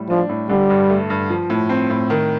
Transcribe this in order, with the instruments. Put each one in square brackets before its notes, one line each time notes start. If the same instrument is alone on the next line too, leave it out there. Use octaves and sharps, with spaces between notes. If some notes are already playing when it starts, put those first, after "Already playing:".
Already playing: [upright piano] A2 G3
[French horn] F3 [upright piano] D4
[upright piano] A2
[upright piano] D3 [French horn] G3
[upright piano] G2
A3
G2
F3
A2
C4
A2
D#3